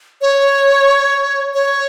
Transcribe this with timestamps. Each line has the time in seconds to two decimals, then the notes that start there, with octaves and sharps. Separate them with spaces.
0.21 C#5
1.54 C#5